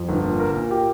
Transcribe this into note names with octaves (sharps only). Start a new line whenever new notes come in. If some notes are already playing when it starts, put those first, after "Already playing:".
Already playing: F2
G1
A#2
A#4
A#2
G4